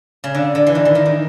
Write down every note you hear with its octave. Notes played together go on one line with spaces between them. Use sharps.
C#3
D3
D3
E3
D#3
E3
D#3
D#3